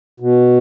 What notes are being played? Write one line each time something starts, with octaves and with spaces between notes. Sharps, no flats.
B2